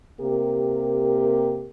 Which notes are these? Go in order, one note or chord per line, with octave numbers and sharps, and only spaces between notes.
C3 A#3 G4 A#4